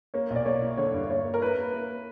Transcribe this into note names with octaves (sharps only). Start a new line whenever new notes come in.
A#3 C#5
B1
D5
A#3 C#5
E4
D3 C#5
G2
A#3 C#5
A#3
A#4
E4 B4
A#3
A#3